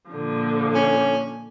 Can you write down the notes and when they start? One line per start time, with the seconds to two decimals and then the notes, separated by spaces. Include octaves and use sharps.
0.10 A#2 D3 F3
0.75 C#4